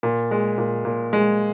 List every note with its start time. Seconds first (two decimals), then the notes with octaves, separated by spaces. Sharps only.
0.03 A#2
0.31 G#3
0.58 A#2
0.85 A#2
1.13 G#3